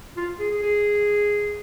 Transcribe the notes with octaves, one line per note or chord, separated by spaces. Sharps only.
F4
G#4
G#4
G#4